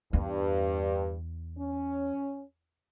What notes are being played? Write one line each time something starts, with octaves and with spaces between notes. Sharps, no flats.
E2 G2
C#4